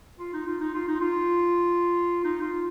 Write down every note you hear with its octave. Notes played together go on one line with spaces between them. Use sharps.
F4
D#4
F4
D#4
F4
D#4
F4
D#4
F4